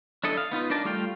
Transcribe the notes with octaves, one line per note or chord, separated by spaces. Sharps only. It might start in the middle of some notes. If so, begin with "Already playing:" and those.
D4 E4 A4 D#5
F5
B3 D#4 F4 B4
D4 D#4 A#4 D5 A5
G3 A3 F4 F5 G5